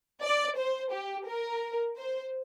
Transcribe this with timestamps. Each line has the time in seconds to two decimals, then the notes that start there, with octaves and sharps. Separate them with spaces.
0.23 D5
0.58 C5
0.92 G4
1.27 A#4
1.96 C5